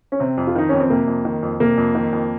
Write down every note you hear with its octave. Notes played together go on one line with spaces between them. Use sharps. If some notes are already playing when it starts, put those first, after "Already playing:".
C#4
C3 C4
F2
F4
D#3 D#4
F2 C#4
C4
C3 A#3
F2
D#3
F2
C3 A#3
F2
D#3
F2